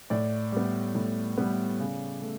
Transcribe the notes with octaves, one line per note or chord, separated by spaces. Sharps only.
A2 D5
G3 B3
A2
G3 B3
C#3
A3